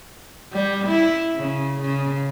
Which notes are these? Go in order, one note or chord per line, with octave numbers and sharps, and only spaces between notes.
G3
E4
C#3
C#3